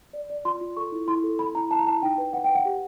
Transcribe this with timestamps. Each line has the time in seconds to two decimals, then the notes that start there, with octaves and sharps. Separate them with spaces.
0.13 D5
0.30 D5
0.45 F4 C6
0.61 F4
0.77 A4 C#6
0.92 E4
1.08 E4 C6
1.24 A4
1.39 E4 B5
1.55 E4 A#5
1.71 E4 A5
1.79 A#5
1.87 E4 A5
2.02 D#4 G5
2.18 B4
2.33 B4 F#5
2.44 B4 G5
2.55 F#5
2.65 G4